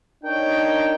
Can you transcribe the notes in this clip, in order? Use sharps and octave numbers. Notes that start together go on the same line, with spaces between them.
D4 D#4 A#4 C#5 G5